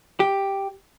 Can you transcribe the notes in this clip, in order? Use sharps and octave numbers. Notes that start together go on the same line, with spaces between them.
G4